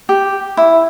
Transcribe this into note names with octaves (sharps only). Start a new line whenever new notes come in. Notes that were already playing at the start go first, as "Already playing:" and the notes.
G4
E4